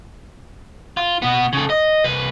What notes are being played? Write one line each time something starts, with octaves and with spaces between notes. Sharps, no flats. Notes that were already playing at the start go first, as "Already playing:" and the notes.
F4
B2 B3
C#3 A4
D#5
C2 B4